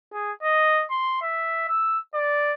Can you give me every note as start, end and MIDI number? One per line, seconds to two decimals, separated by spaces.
0.13 0.31 68
0.43 0.85 75
0.91 1.17 84
1.22 1.65 76
1.68 1.98 88
2.14 2.53 74